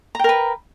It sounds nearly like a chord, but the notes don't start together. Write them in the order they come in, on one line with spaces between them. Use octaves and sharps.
A#5 G5 A#4 B4